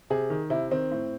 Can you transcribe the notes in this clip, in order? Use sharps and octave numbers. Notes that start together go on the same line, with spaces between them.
C3 G#4
D#3
C3 E4
D#3 C4
A2